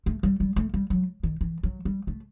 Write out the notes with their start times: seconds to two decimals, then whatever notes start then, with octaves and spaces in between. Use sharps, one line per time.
0.06 A3
0.23 G3
0.40 G3
0.56 A3
0.74 G3
0.90 F#3
1.23 D#3
1.41 E3
1.63 F#3
1.85 G3
2.07 A3